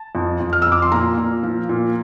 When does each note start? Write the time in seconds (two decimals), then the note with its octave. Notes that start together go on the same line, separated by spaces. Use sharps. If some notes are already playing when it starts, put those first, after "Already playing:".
Already playing: A5
0.15 F2
0.40 F2
0.53 F6
0.62 F2 E6
0.72 D6
0.82 C6
0.92 A#2 A#5
1.17 A#2
1.43 F3
1.69 A#2